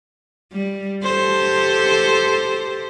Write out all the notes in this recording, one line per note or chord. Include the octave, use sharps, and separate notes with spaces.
G3
G4 A4 C5